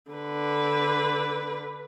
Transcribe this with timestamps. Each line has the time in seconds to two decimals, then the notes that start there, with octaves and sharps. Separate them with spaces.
0.11 D3 B4